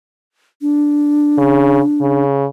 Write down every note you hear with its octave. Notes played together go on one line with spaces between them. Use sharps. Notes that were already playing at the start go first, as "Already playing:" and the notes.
D4
C#3
C#3